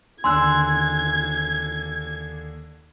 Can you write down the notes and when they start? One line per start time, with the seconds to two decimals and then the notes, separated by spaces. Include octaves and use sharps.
0.24 D#2 D3 G#5 C6 E6 F#6 G#6